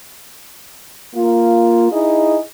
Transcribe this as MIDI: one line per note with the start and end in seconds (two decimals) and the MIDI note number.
1.15 1.88 58
1.15 1.88 65
1.92 2.38 63
1.92 2.38 64
1.92 2.38 68
1.92 2.38 75